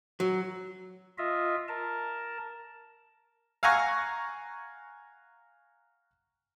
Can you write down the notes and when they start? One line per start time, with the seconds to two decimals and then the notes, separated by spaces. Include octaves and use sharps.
0.20 F#3
1.18 F4 D#5 E5
1.68 A#4 A5
3.63 F5 F#5 G#5 A#5 C#6